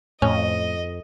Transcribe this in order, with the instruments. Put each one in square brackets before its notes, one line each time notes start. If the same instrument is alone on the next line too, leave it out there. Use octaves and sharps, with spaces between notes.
[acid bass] F2 [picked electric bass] A2 [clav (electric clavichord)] C#4 [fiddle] D#5